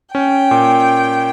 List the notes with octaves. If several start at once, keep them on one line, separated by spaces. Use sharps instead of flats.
C#4 G5
A#2